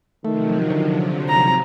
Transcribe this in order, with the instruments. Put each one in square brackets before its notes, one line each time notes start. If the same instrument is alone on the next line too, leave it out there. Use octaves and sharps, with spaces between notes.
[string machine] C3 F3 F#3 [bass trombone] D#3 [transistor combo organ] A3
[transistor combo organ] D3
[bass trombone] G#1 [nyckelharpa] A#5